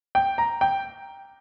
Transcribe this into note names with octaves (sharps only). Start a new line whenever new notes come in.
G5
A#5
G5